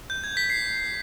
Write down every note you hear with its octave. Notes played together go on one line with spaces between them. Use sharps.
G6
G#6
B6
C7